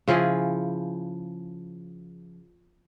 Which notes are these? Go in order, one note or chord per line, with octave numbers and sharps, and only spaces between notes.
C#3 F3 E4 G#4